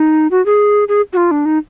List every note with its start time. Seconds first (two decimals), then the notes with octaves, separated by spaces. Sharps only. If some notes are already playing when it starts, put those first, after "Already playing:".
Already playing: D#4
0.31 F#4
0.46 G#4
0.88 G#4
1.13 F#4
1.17 F4
1.31 D4
1.45 D#4